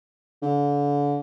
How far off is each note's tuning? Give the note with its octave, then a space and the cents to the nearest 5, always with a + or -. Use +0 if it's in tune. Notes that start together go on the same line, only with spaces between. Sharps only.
D3 -35